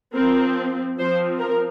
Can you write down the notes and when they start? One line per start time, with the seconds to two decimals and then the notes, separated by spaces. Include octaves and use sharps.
0.15 F3 C4 A#4
0.98 F3 C4 C5
1.40 A#4